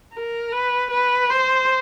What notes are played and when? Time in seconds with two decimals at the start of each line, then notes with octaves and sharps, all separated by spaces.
0.13 A#4
0.52 B4
0.91 B4
1.29 C5